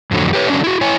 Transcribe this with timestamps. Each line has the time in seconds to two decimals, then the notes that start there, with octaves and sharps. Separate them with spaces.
0.11 F2 A2 D3 F#3
0.33 G4 B4 C#5
0.48 D3 F#3 C#4 D4
0.64 E4 F#4
0.81 E4 C#5 G#5